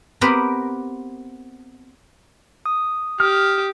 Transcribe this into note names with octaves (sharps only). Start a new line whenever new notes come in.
B3 C4 G4 A#4 B4
D#6
G4 D#6 F6